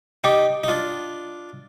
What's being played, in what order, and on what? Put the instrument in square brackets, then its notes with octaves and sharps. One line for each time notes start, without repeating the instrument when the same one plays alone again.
[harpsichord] D#4 G4 [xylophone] D#5 G5 D6
[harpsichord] D#4
D4 F4